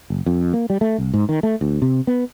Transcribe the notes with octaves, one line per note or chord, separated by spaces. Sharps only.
F#1
F2
A#3
G3
A3
C2
G#2
D#3
A3
D2
C3
B3